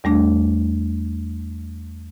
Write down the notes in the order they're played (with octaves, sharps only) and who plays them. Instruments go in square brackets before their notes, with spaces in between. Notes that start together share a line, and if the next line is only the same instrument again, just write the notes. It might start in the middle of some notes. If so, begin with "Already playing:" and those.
[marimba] E2 G3 A3 D4